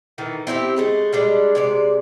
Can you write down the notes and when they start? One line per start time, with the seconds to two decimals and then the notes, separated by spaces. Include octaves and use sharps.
0.18 D#3 E3 A4
0.47 C4 E4 G4 G5
0.76 C#3 G#3 A3
1.13 G3 G#3 D4
1.55 C3 G#3 D5